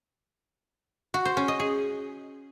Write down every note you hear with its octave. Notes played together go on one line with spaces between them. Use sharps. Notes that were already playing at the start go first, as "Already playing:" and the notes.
F#4
C5
C#4
D#5
G#4